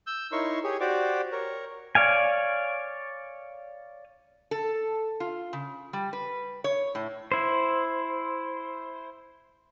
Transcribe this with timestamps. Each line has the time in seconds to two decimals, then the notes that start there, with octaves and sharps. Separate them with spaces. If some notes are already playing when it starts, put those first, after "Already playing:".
0.07 E6 G6
0.32 D#4 E4 A#4 C#5 C6 C#6
0.64 G4 G#4 C#5
0.80 F#4 G4 C5 D5 D6
1.32 A#4 C#5
1.95 C#5 D5 F5 G#5
4.51 A4
5.20 F4
5.53 C#3
5.93 G3
6.13 B4
6.64 C#5
6.95 A2
7.32 E4 C5